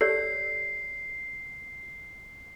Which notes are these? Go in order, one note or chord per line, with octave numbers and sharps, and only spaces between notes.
G4 A4 C#5 D5 C7